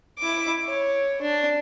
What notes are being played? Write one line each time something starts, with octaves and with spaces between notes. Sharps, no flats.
E4 D6
C#5
D4